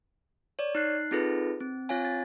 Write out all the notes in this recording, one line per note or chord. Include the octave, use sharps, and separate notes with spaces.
C#5 D5
D#4 F#6 C7
C4 D#4 F4 G#4 A4 B4
C4
C4 F4 C#5 F5 G#5
A6